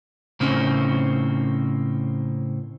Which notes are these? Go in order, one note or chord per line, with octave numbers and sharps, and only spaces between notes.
A2 C#3 A#3 C4 C#4 D#4